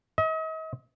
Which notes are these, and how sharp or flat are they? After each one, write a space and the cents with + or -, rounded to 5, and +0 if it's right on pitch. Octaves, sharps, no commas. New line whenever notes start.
D#5 +40